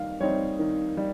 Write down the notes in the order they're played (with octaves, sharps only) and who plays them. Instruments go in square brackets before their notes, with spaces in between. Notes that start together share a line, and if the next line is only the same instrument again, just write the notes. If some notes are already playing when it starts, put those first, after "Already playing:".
Already playing: [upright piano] D#3 G3 C4 F5
G3 C4 D#4 C#5
D#3
G3